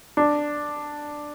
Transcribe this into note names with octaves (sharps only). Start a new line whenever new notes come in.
D4